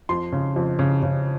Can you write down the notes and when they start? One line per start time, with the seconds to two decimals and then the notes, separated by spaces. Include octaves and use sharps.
0.09 F2 C6
0.32 C#3
0.56 F2
0.79 C#3
1.03 C#3